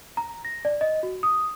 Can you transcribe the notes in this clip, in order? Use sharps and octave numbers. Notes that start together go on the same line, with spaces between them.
A#5
A#6
D5
D#5
F#4
D#6